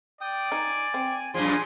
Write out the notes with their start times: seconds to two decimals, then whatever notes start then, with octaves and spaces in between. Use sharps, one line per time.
0.21 D5 G5 D#6
0.52 D#4 G#5
0.94 C4
1.34 F#2 A#2 F3 G#4 G#5 C6